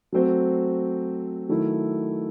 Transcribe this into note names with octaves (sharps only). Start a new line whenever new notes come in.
F#3 A3 C4 F#4 C5
D#3 F#3 A3 E4